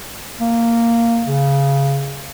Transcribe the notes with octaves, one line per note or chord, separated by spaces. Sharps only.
A#3
C#3